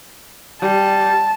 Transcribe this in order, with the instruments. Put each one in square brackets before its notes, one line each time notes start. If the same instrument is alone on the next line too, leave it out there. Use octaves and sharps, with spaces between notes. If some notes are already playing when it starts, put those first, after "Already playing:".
[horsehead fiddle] G3 [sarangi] A5